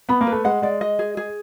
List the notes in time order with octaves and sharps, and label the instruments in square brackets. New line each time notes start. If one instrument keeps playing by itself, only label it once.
[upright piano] B3 [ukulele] B5
[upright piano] A#3
[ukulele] B4
[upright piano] A3
[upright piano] G#3 [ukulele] F#5
[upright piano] G#3 [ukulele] D5
[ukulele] D#5
G#4
G#4